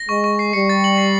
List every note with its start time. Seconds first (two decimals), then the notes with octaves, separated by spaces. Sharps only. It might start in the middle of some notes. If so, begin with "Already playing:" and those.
Already playing: A#6
0.09 G#3 C#6
0.24 C#6
0.39 C7
0.53 G3 C#7
0.69 A6
0.84 F#7
0.98 C7